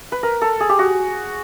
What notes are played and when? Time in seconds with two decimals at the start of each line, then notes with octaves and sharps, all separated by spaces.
0.12 B4
0.23 A#4
0.41 A4
0.60 G#4
0.69 G4
0.79 F#4